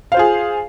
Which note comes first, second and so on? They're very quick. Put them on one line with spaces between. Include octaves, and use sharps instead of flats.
F5 C5 F4 G#4